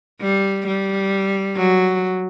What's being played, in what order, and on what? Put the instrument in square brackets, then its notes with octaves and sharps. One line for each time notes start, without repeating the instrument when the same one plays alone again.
[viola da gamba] G3
G3
F#3